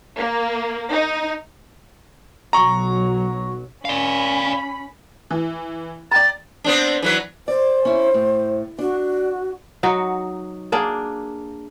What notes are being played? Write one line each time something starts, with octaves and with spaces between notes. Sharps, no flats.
A#3
D#4
B1 F#3 A#5 C#6
C#4 D5 F5 B5
E3
D5 G5 A#5 A6
B3 C4 D4
E3 F#3 B4
C5 D5
C#4 E4
A2
D4 F#4
F#3 D#4 F#4
A#3 D4 G#4